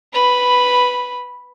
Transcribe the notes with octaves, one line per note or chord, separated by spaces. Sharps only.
B4 B5